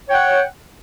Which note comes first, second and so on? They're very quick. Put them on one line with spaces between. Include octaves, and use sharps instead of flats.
C#5 G5 F#5